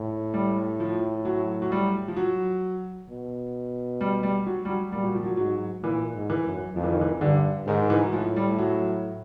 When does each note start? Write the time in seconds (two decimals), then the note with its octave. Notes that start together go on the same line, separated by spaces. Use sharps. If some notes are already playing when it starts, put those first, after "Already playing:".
Already playing: A2
0.34 G3
0.80 F3
1.25 F#3
1.62 F#3
1.72 G3
2.08 F3
2.16 F#3
3.09 B2
4.01 G3
4.23 G3
4.47 F#3
4.65 G3
4.69 F#3
4.92 A#2 G3
5.04 F#3
5.15 F3
5.26 F#3
5.37 G#2 F#3
5.83 A#2 E3
6.14 G#2
6.30 E3
6.45 F#2
6.75 F2 F3
6.84 E3
6.92 D#3
7.01 E3
7.21 G2 D3
7.67 G#2 D#3
7.90 E3
8.04 F#3
8.12 A2 F3
8.36 G3
8.58 F#3